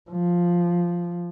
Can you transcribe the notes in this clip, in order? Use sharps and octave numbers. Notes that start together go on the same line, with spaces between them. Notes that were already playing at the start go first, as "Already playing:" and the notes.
F3